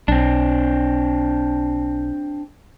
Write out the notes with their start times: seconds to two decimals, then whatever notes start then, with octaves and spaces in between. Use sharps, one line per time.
0.08 B1 C4 D4